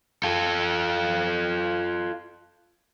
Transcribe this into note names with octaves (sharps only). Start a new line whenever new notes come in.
F4 A4